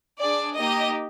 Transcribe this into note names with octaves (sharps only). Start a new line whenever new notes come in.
D4 G#4 D5
A#3 D#4 G4 D#5